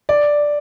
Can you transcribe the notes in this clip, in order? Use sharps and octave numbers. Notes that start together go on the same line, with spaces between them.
D5